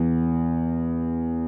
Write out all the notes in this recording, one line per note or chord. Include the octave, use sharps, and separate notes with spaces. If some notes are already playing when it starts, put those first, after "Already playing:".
Already playing: E2